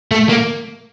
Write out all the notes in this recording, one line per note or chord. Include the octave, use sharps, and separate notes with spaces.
A3
A#3